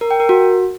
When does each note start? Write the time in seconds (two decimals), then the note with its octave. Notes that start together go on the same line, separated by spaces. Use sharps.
0.01 A#4
0.11 G5
0.20 A#4
0.29 F#4